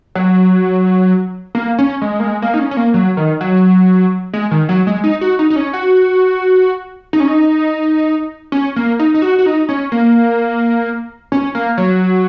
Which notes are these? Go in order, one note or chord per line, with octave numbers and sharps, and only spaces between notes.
F#3
A#3
C#4
G#3
A#3
G#3
A#3
D#4
C#4
C#4
A#3
F#3
D#3
F#3
G#3
D#3
F#3
G#3
D#4
F#4
D#4
D#4
C#4
F#4
D#4
C#4
D#4
C#4
A#3
D#4
D#4
F#4
F#4
D#4
C#4
A#3
C#4
A#3
F#3